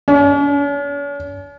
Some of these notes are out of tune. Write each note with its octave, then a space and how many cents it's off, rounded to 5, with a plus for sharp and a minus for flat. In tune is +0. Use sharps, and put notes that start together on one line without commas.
C#4 +45